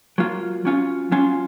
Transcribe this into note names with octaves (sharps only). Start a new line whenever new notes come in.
F#3 A#3 F4
F#3 C#4 F4
F#3 C#4 F4